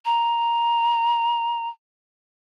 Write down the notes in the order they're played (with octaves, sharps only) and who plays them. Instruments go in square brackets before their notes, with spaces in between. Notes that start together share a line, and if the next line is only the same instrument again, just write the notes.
[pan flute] A#5